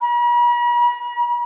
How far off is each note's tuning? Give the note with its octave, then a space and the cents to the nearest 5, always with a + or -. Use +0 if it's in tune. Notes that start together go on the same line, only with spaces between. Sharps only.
B5 -45